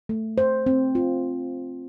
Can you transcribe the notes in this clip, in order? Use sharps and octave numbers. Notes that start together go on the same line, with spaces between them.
A3
C5
C4
F4